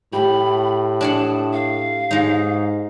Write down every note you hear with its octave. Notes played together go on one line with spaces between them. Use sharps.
A2 G4 B5
D4 G#4 F#5 A5
F5
G#2 G#3 D#4